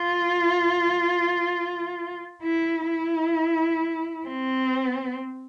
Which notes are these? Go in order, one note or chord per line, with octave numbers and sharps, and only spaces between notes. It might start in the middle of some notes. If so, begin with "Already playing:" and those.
Already playing: F4
E4
E4
C4